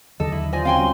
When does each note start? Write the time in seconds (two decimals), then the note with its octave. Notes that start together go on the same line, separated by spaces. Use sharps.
0.20 D#2 D3 F#3 A4 D#5
0.32 E4
0.53 F4 C5 D5 D#5 G#5
0.65 C4 C#4 F#4 F5 G5 G#5 C6
0.78 G3 C#4